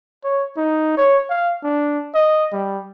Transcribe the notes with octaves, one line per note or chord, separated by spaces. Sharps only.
C#5
D#4
C#5
F5
D4
D#5
G3